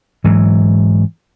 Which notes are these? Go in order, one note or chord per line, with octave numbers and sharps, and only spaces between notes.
G#2 E3 F#3